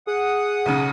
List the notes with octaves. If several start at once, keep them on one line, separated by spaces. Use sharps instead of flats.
G#4 F#5 D#6
B1 C#3